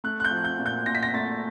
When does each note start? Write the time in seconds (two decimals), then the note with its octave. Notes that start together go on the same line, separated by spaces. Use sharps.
0.04 A3 F#6
0.20 F#6
0.25 G6
0.31 F3
0.44 G6
0.59 A#2
0.66 G6
0.86 A#2 A#6
0.95 B6
1.03 A#6
1.14 A3 A6